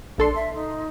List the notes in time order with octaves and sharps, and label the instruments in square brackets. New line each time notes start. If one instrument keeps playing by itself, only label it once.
[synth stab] A#1 A4 C6 [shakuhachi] D4
[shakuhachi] E5
D#4